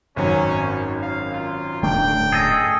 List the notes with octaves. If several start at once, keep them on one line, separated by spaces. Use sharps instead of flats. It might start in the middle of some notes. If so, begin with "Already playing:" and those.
G#1 F#2 F#3 C#4
F5
F4
D1 A3 D4 G5
G#4 A4 D#5